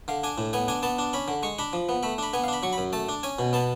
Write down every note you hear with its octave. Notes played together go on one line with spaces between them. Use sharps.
D3 F5
D4 G#5
A2
B3 G#5
D4 G#5
B3 A5
D4
C#4 B5
D3
G#3 C#6
D4 B5
F3
B3
A3 B5
D4 B5
B3 G#5
F5
D4 B5
F#3 C#6
B5
F#2
A3 A5
D4
C#4 G#5
B2
B3 A5